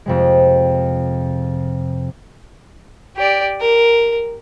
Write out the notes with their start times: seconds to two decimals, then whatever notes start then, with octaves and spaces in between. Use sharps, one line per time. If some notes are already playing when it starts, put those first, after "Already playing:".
0.06 F2 C3 G#3
3.16 G4 D5
3.60 A#4